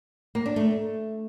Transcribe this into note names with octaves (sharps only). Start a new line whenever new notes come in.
A#3
D4
A3